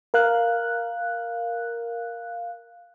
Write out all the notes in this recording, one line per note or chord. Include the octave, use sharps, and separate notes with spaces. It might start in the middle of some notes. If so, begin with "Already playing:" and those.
A#4 F5 F#6